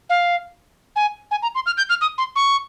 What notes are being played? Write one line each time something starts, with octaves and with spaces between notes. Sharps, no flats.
F5
G#5
G#5
A#5
C6
F6
G6
F6
D#6
C6
C#6